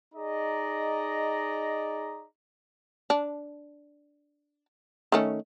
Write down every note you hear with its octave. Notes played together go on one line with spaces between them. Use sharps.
D#4 G#4 D5 D#5 A#5
D4
D#3 A3 C#4